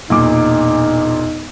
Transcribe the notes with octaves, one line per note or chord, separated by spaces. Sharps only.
E1 A#2 D#4 D6